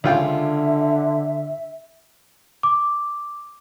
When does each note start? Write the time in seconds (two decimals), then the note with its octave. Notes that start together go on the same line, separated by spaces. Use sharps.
0.04 C#2 D3 F4 E5 G5
2.63 D6